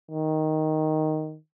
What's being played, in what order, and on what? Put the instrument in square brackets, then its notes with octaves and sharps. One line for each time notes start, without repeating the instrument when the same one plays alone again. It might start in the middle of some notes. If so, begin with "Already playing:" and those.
[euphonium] D#3